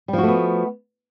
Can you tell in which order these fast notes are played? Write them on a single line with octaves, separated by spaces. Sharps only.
G3 F3 F#4 A3 B3